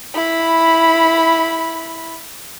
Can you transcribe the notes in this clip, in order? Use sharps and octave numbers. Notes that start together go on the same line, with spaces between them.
E4 B5